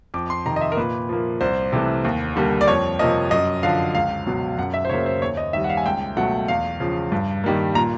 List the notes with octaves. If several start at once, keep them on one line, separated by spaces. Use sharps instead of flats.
F2 D6
C6
C3 D#3 A#5
D#5
E5
A#4
A#2 B4
F3 A#3
C2 C5
C3 E3 A3
D#2
D3 G3 A#3
D5
F2 C#5
C3 F3 A#3 D#5
F#2 D#5
D3 F3 F5
C#2 F5
B2 F#3
F#2 F#5
E5
C5
C#3 F#3 A#3 C#5
C5
D#2 C#5
D#5
D#3 G3 E5
F#5
F5
G#5
C#2 G5
B2 F#3 A3 F#5
E2 F5
C#3 F3
G2
D#3 G3 A#3
A#2 A#5